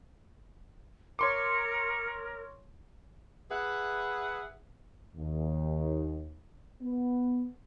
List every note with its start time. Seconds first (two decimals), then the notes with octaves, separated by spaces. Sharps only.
1.19 A#4 C#5 C6 D6 C#7
3.51 G#4 B4 E5 F#5
5.17 D#2
6.81 B3